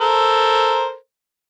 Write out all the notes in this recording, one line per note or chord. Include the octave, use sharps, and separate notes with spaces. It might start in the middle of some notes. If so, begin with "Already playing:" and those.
A4 A#4 C5